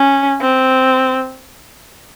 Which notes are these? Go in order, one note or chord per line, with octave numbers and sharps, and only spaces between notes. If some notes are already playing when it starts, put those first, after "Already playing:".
Already playing: C#4
C4